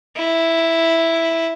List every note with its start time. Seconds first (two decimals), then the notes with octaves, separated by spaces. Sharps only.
0.17 E4